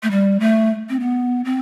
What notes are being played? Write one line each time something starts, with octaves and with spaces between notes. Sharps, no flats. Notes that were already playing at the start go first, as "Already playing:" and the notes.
A3
G3
A3
C4
B3
C4